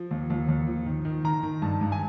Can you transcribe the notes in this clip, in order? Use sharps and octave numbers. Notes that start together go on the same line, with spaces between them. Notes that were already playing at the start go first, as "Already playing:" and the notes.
Already playing: F3
D#2
D#2
D#2
F3
D#3
D#3
D#3 A#5
D#3
G2 A5
G2
G#5